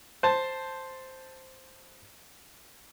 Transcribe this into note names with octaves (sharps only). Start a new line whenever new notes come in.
C5 A5